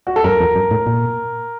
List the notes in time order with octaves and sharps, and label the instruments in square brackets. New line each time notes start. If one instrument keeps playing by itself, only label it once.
[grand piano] F#4
A4
[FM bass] F#2 [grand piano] A#4
[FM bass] F2
F#2
A2
A#2